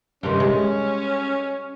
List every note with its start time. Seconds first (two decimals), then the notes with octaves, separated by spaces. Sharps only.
0.23 G2 C3 D#3 C#4
0.40 G#3